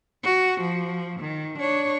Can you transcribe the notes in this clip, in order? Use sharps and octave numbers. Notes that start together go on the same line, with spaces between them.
F#4
F3
D#3
D4 C#5